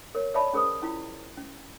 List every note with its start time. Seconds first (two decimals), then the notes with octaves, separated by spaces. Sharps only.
0.15 A#4 C#5
0.34 B4 C#5 D5 E5 A5 B5
0.53 C#4 G#4 A#4 C5 D#6
0.82 C#4 E4 F4
1.37 C#4